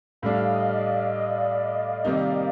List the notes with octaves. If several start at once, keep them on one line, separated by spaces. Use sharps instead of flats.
A2 G3 D4 F5
D#5
D5
F5
D#5
C3 D#3 G3 A#3 D#4